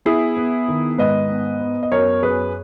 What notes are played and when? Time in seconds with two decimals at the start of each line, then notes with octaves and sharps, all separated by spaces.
0.05 B3 E4 G#4
0.37 B3
0.68 D#3
0.98 G#2 B4 D#5
1.29 B3
1.61 B3
1.83 D#5
1.92 F#2 A#4 C#5
2.22 F#2 G#4 B4